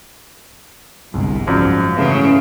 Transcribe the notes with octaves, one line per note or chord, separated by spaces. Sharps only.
G1 C2 G#2
F#2 F3 D5 F5
C#3 E3 A3